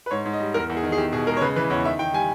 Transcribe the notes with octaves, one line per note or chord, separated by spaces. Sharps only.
B4
G#2 C#5
G#2
D#5
G3
E2 A#4
E2
G#4
D#3
G#4
E2 G4
B2 G#4
G#3 A#4
C#5
C#3 B4
E3 B4
E2 C#5
D#3 E5
D#3 G5
G3 G#5